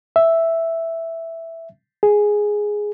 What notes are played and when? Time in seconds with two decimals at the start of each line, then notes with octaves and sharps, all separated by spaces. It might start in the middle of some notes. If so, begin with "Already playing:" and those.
0.16 E5
2.03 G#4